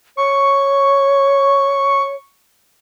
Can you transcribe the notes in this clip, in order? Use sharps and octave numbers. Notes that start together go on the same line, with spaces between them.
C#5 C#6